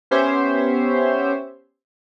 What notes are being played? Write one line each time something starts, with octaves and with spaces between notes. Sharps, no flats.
B3 C#4 G4 C5 C#5 E5